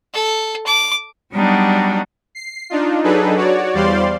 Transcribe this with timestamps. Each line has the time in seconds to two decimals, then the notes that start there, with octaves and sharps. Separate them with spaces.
0.14 A4
0.66 D6
1.33 F#3 G3 B3 D4 D#4 F#4
2.35 C7
2.70 D4 D#4 F4
3.04 F#3 D4 D#4 G#4 A4 B4
3.37 F#4 C#5 D5
3.74 E2 G3 C5 D5 F5 C6